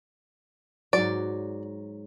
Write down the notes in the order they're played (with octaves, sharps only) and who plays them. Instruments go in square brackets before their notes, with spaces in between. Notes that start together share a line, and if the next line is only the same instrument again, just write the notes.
[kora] G#2 F#3 [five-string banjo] D5